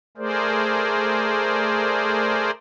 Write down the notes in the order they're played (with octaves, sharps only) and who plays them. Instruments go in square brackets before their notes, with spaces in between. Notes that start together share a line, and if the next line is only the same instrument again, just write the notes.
[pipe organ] A3 G#4 A#4 C5 D5